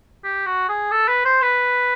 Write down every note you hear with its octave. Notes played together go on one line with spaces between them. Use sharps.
G4
F#4
G#4
A4
B4
C5
B4